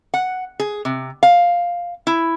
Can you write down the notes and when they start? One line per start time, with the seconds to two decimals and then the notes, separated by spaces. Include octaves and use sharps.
0.14 F#5
0.60 G#4
0.85 C3
1.23 F5
2.07 E4